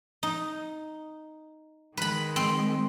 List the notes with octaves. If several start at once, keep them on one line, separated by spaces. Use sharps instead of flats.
D#4
D#3 G#3 B4 B5
C4